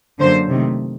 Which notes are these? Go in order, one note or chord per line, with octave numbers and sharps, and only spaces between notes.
F#2 D3 F#3 A#3 C5
C3 D#3 A3